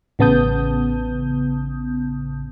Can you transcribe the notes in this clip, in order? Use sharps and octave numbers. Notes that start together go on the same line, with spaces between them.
A1 C#3 B3 A5 D#6 G6